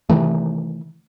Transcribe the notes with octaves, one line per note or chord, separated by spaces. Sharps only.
C3 D#3 E3 A3